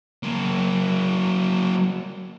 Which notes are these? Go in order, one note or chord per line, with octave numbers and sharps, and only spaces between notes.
F#3 A#3